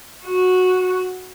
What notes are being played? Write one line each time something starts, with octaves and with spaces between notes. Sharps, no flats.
F#4